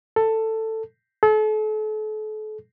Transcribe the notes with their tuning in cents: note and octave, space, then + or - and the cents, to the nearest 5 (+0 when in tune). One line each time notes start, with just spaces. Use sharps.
A4 +10
A4 -40